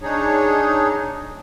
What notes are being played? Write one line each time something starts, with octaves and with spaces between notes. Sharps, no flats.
D4 D#4 G#4 C#5